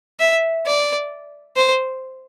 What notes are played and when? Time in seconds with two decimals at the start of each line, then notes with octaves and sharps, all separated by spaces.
0.20 E5
0.66 D5
1.57 C5